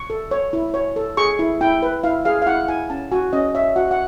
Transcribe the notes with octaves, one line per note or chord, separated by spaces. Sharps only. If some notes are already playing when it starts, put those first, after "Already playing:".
Already playing: C#6
A4
C#5
E4
C#5
A4
G#4 C#6
E4
E4 G5
B4
E4 F5
G#4 F5
F5
E4 F#5
E4 G#5
C#4 A5
F#4 G#5
C#4 D#5
C#5 E5
F#4 F#5
F#5